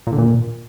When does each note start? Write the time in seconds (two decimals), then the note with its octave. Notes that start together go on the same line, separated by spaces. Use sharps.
0.07 A#2
0.13 D3
0.18 A#2